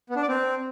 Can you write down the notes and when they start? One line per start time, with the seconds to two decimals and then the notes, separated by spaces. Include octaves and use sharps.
0.10 B3
0.16 D4
0.22 D5
0.28 C4